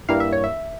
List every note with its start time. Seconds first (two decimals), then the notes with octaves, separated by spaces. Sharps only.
0.09 G2 G3 A#3 E4 F5
0.20 E5
0.33 C#5
0.44 E5